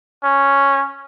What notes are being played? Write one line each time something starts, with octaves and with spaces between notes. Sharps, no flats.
C#4